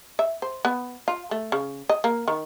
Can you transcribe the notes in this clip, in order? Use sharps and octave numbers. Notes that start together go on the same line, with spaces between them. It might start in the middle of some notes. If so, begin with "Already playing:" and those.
E5
C5
B3
F4
A3
C#3
D#5
A#3
D#3